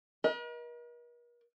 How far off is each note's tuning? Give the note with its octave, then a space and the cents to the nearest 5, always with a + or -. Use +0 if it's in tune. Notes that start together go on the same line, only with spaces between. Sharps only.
A#4 +45 D#5 +20